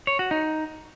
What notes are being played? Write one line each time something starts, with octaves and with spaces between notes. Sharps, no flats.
C#5
F#4
D#4